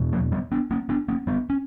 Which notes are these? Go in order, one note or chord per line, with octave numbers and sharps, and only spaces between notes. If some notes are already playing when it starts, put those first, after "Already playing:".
Already playing: E2 B2
F#3 A#3
G3 B3
B3 D4
A#3 C#4
B3 D4
A#3 C#4
G3 B3
C#4